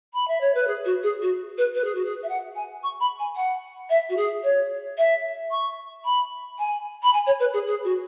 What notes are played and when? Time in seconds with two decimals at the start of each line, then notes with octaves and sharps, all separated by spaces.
0.13 B5
0.27 E5
0.40 C#5
0.54 B4
0.67 G#4
0.85 F#4
1.03 G#4
1.22 F#4
1.57 B4
1.74 B4
1.84 G#4
1.94 F#4
2.04 G#4
2.22 E5
2.28 F#5
2.55 G#5
2.83 C#6
3.00 B5
3.19 G#5
3.35 F#5
3.89 E5
4.09 F#4
4.16 G#4
4.43 C#5
4.97 E5
5.50 C#6
6.04 B5
6.58 G#5
7.02 B5
7.13 G#5
7.26 C#5
7.39 B4
7.53 G#4
7.67 G#4
7.84 F#4